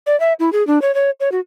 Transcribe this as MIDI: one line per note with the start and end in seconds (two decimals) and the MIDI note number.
0.06 0.18 74
0.20 0.33 76
0.39 0.52 64
0.52 0.65 68
0.67 0.81 62
0.82 0.94 73
0.95 1.11 73
1.20 1.32 73
1.32 1.40 66